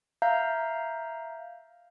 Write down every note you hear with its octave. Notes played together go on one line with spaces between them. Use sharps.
E5 F5 A#5 G6